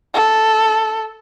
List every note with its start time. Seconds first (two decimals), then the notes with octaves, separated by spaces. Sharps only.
0.14 A4